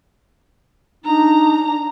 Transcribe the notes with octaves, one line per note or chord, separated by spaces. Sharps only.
D4 D#4 A#5